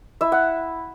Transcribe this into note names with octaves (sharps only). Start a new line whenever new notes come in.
E4 E5
F#5